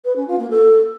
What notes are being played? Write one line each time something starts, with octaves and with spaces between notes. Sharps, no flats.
B4
C#4
F4
A#3
A4